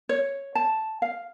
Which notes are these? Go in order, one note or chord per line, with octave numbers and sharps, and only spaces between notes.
C#5
A5
F5